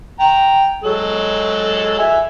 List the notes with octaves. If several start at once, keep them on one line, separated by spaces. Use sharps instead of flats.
G5 A#5
F#3 G#3 A4
E5 G#5